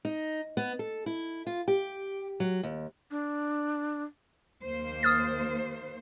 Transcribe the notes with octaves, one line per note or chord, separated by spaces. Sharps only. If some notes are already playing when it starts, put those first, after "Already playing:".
D#4
B3
A4
E4
F4
G4
F#3
D#2
D4
D#2 A#3 C5
D#6 F6 A6